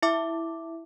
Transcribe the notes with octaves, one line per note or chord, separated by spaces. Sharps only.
E4 E5 D6